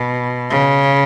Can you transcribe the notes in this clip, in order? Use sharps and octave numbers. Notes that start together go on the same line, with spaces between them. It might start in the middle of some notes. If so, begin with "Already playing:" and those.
Already playing: B2
C#3